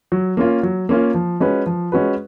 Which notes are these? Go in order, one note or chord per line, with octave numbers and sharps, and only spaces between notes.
F#3
A#3 C#4 F4
F#3
A#3 C#4 F4
F3
G#3 C#4 F#4 B4
F3
G#3 C#4 F#4 B4